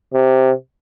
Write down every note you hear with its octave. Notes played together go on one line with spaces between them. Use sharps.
C3